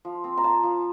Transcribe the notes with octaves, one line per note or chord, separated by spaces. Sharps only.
F3
C4
A#5
F3 A5
F3